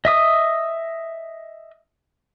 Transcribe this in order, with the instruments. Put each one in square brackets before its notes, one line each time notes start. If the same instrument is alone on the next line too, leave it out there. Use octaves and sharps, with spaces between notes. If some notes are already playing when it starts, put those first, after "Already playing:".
[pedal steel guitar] D#5 E5 D#6